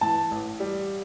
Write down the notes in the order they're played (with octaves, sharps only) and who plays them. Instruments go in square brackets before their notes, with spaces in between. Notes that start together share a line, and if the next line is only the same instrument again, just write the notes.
[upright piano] E3 A5
A1
G3